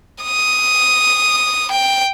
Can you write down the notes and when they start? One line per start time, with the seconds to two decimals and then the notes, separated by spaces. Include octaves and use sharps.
0.24 D#6
1.72 G5